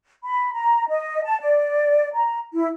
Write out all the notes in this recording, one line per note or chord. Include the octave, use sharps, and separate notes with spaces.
B5
A#5
D#5
A5
D5
A#5
E4